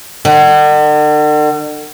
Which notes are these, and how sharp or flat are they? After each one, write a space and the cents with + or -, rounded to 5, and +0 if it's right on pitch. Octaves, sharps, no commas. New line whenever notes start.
D3 +45